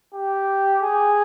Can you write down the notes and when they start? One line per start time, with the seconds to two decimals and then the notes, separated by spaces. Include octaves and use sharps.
0.14 G4
0.82 G#4